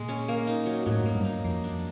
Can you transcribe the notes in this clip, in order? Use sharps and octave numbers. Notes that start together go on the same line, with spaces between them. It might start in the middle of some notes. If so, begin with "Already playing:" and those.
Already playing: A#2 G#3
C#4
A#3
D#4
F#3
A2 F#3
G#2 A#3
G2
D#4
F2 A#3
D4